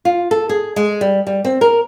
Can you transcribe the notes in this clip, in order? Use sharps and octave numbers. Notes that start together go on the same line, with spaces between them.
F4
A4
G#4
G#3
G3
G3
C4
A#4